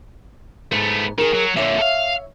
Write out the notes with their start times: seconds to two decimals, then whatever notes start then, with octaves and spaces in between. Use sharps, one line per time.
0.72 G#2 A3 B3
1.18 D#3 G#4 A#4
1.34 F#3
1.57 A#2 D3 C#5 E5
1.79 A4 F5